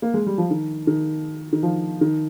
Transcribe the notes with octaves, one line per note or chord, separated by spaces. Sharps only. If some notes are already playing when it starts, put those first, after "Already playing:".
A#3
G#3
G3
F3
D#3
D#3
D#3
F3
D#3